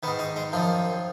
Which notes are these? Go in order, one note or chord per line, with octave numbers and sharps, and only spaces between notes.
G#2 D#3 B3
D#4
G#3
F#2 D#3 F3